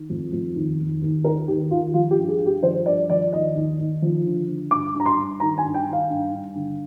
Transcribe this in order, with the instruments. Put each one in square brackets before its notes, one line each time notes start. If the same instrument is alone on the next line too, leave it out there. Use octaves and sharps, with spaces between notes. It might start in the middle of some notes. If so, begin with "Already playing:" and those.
Already playing: [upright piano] D#3
F2
F2
D#2
D#2
D#2
D#2 A#4
D#2 G4
D#2 F4
F3 F4
G4
G2
G#4
G2
G4
F3 C5
G2 D5
F3 D5
D#2 D#5
D#2
D#2
F3
D3
D3
G2 D6
G2
A#5
C6
G2
D#3 A#5
G#5
G2
G5
D#3
F5
G2
G2
D3